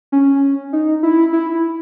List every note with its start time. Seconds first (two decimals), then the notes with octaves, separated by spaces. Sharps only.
0.12 C#4
0.73 D#4
1.03 E4
1.33 E4